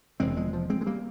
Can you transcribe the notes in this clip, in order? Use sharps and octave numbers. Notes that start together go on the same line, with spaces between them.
E1 E2 C3 G#3 C4
F3 G#3
F3
G#3 C4
G#3
G3 A#3